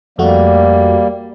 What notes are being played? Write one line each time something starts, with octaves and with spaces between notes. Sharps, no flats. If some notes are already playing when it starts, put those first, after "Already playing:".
F2 G3 A3 A#3 F#4